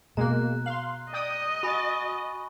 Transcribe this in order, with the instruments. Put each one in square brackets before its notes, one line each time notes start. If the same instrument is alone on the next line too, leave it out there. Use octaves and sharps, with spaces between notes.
[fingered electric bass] B2 [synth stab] G#3 A#3 [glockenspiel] A#5 F#6
[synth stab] F5 C6 [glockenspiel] F#7
[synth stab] D5 G5 D#6 [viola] D#5
[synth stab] F#4 A6 [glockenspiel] G#5 B5 C#6